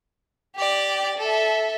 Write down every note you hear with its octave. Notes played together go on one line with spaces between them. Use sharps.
G4 D5
A4 E5